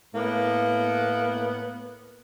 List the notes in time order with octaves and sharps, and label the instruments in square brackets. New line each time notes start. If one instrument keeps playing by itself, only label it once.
[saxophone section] A2 A#3 B3